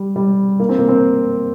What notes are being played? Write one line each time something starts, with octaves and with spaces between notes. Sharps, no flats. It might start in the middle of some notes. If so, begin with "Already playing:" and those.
Already playing: G3
G3
A#3
C4
A#3
C4